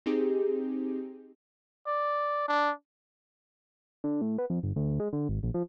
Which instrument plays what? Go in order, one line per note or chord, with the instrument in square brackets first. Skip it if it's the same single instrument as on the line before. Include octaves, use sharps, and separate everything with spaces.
[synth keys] C4 D#4 G4 G#4
[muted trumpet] D5
D4
[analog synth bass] D3
A2
B3
F2
G1
D2
G#3
D3
G#1
A#1
F3